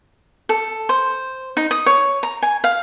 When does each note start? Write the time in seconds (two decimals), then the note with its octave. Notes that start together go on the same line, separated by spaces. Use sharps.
0.49 A4
0.89 C5
1.57 D#4
1.71 D#6
1.86 C#5
2.23 A#5
2.42 G#5
2.64 F5